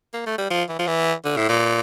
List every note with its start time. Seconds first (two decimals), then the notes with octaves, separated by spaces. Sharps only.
0.13 A#3
0.26 A3
0.38 G3
0.50 F3
0.69 E3
0.79 F3
0.87 E3
1.24 D3
1.37 A2
1.49 A#2